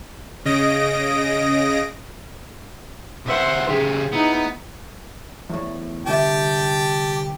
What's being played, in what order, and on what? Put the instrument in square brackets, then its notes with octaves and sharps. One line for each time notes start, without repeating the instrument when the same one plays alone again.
[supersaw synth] C#3 D#5 A#6 D7
[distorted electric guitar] C2 F#5 [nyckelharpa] C5 E5
[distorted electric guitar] C#3 G4 [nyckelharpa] G#4
[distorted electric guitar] B3 [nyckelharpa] D#4 E4
[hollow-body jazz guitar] E2 A2
[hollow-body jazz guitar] C2 D3 E5 [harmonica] G4 G5 A5